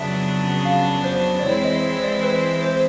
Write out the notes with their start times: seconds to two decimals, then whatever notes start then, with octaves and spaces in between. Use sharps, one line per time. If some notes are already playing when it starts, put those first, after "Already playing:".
Already playing: F2 C#3 F#3 B3 D4 E5
0.65 F5
1.04 C5
1.39 D5
1.43 E3 G#3 C4 E4 C#5
1.64 D#5
2.03 D5
2.23 B4
2.63 C5